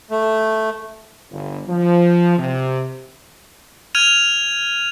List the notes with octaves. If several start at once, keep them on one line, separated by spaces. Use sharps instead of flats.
A3
G1
F3
C3
F6 G#6 D#7 F7